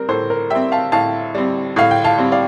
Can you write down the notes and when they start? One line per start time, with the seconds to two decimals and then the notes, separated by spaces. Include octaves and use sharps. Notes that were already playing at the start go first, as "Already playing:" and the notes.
Already playing: G3 C4 A#4
0.09 A2 A4 C5
0.30 A#4
0.50 G3 C4 E5 G5
0.72 F5 A5
0.92 A2 F5 A5
1.35 G3 C4
1.76 A2 F5
1.91 G5
2.04 F5 A5
2.18 G3 C4
2.32 D5 F5